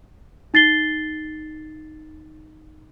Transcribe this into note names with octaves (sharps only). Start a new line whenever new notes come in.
D#4 A6 C7 G7